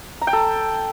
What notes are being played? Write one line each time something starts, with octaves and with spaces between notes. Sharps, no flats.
A#5
G5
A4